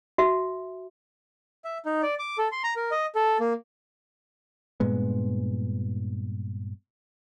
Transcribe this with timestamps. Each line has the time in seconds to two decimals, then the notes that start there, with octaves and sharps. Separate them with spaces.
0.18 F#4 E5
1.65 E5
1.85 D#4
2.02 D5
2.19 D6
2.38 A4
2.52 C6
2.64 A#5
2.76 A#4
2.91 D#5
3.15 A4
3.40 A#3
4.80 G2 A#2 G#3 B3